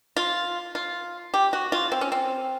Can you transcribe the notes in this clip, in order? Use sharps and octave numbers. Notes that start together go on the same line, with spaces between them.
F4
F4
G4
F#4
F4
C4
C#4
C4